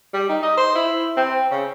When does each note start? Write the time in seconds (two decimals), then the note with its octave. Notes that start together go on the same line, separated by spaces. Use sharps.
0.13 G3
0.29 D#4
0.42 D#5
0.57 C5
0.75 E4
1.16 C4
1.51 C#3